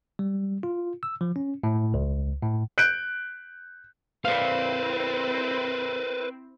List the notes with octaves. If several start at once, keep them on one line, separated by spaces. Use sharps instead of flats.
G3
F4
E6
F3
C#4
A2
C#2
A2
F#6 G6 D7
C4 E4 B4 C5 D5 F5